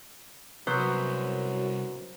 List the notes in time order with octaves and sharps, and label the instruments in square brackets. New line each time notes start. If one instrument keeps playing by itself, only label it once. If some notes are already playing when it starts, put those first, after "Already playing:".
[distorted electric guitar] C2 [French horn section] F#2 F#4 [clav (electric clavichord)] F#3 B3 [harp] C5